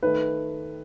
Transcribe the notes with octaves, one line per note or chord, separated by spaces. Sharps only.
D#3 A3 B4